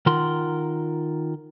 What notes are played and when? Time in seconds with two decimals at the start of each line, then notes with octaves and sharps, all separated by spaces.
0.06 D#3 F4 A#4 F#5 C6